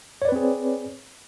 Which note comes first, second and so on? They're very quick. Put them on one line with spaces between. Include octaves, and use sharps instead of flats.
C#5 D5 B4 C4 G#4